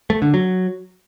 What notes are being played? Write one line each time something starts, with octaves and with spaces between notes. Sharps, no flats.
A3
D3
F#3